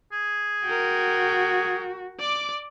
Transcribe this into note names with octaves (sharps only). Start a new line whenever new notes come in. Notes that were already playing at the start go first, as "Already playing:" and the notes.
G#4
F#4 A#4 G5
D5 D6